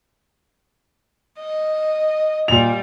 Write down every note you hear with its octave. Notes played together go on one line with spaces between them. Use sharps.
D#5
A#2 G3 F7